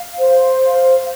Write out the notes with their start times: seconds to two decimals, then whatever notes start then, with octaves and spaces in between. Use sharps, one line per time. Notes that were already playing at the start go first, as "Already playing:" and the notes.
Already playing: F5
0.18 C5
0.63 F5